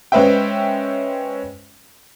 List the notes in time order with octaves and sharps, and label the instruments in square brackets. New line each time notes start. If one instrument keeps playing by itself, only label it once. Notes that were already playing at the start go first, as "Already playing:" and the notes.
[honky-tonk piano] G#3 C#4 B4 C5 E5 G5